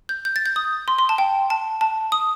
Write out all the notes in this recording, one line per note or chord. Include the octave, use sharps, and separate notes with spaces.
G6
G6
A6
G6
D#6
C6
C6
A5
G5
A5
A5
D#6